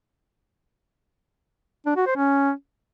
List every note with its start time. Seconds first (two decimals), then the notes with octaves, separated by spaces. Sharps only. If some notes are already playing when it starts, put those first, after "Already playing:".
1.86 D4
1.96 F#4
2.06 C5
2.16 C#4